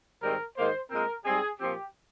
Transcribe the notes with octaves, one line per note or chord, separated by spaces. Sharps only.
G#2 D#3 G3 C4 A#4
G#2 D#3 A#3 C5
A#2 G#3 C4 A#4
G#2 G3 C4 G#4
A#2 F3 C4 G4